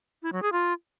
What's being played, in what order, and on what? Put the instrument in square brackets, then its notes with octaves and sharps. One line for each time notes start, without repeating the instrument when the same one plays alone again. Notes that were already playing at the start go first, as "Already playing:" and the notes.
[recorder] E4
F#3
G#4
F4